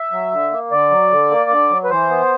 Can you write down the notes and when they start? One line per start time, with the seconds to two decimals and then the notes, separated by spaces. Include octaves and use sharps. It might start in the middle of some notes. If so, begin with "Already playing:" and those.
Already playing: E5
0.12 F#3
0.32 D3
0.51 A#3
0.71 D3 D5
0.91 F#3
1.11 D3
1.31 A#3
1.50 D3
1.70 F#3
1.84 B4
1.90 E3 C5
2.09 B3